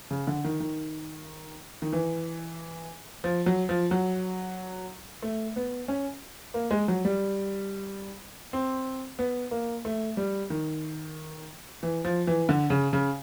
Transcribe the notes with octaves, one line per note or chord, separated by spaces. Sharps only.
C#3
D3
D#3
D#3
D#3
E3
F3
F#3
F3
F#3
A3
B3
C#4
A#3
G#3
F#3
G3
C4
B3
A#3
A3
G3
D#3
E3
F3
E3
D3
C#3
C#3